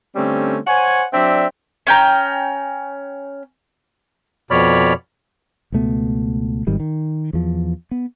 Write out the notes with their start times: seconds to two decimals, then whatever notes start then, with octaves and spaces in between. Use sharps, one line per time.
0.15 D3 G3 A3 C4 C#4
0.67 C5 C#5 F#5 G#5
1.12 F#3 C4 D4 D5 E5
1.87 C#4 G5 A#5
4.51 F2 B2 C#5 D5 B5 F6
5.72 C#2 B2 A3 B3
6.67 G#1 G#2 D#3 G3
6.80 D#3
7.33 E2 F3
7.91 B3